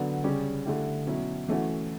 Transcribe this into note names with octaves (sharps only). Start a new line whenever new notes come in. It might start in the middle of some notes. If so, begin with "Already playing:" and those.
Already playing: D3 F#3 B3 D4
C#3 G3 C#4 G4
D3 A3 E4 G4
B2 F#3 C#4 E4
E3 A3 C#4 F#4